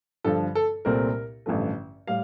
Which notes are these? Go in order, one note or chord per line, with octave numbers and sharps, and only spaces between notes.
G2 D3 F3 A4
A4
C2 A#2 A3 C4 A#4
A1 G2 D3 F3 A3
A2 G3 F5